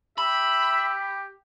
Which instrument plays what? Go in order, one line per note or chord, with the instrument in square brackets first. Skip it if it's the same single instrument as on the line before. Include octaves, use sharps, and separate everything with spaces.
[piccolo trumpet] G4 [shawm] E5 [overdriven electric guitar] B5